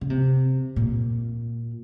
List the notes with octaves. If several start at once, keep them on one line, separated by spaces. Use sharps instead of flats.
C#3
C3
A#2